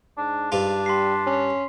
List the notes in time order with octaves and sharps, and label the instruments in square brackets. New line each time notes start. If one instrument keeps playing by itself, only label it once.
[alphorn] G#2 [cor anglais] D4
[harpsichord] G2 F4 [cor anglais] D4
[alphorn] G3 [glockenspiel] C6 B6 C7
[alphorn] C#4